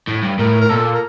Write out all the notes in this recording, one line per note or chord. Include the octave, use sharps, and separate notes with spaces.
A2
G2
A2 A#4
A#4
A#2 A4
A#4